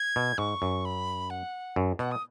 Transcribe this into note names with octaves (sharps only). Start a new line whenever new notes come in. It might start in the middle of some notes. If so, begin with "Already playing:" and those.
Already playing: G#6
B2
G#2 C#6
F#2
B5
F#5
F#2
B2 F#5
D#6